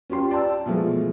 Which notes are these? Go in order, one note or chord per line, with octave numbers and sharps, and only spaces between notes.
C#4 F4 G4 C6
D5 G5 A5 E6
B2 E3 F3 G#3 A3